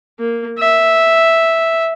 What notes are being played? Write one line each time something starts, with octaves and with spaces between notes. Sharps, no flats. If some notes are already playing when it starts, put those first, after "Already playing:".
A#3
E5